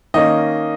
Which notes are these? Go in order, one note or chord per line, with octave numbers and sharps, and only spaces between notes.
D#3 A#3 C#4 D#5